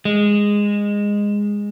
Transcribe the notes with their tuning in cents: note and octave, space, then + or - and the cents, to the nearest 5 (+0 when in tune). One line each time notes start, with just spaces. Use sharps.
G#3 -15